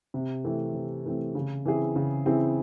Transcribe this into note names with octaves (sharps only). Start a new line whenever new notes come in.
C3
E3 A3 C4
C3
E3 A3 C4
C#3
E3 C4 E4 G#4
C#3
E3 C4 E4 G#4